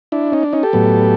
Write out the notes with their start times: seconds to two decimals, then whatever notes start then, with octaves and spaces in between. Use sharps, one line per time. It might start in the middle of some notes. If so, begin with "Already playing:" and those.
0.12 D4 E4
0.32 C#4 D#4
0.43 D4
0.53 C#4 D#4
0.63 G4 A4
0.73 A2 F#3 B3